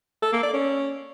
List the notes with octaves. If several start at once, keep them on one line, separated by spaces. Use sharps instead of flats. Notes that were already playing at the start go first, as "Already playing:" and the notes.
A4
A#3
D5
C#4